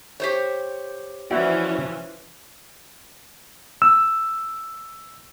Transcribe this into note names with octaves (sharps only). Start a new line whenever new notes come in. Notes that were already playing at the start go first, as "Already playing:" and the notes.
G4 C5 C#5
E3 F3 C#4 E4 F#4 D5
E6